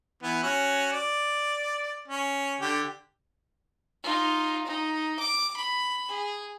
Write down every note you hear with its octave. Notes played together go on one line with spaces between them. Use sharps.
E3 B3
C#4 F#4
D5
C#4
D3 G4
D#4 F4
D#4
D6
B5
G#4